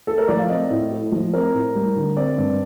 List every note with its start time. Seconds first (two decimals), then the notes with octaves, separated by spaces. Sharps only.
0.07 A3 A4
0.18 A#4
0.28 F3 D5
0.39 F5
0.49 C4 D#5
0.70 A2
0.91 A3
1.12 F3
1.33 C4 A#4
1.54 A2
1.75 G3
1.96 D3
2.17 C4 D5
2.38 G2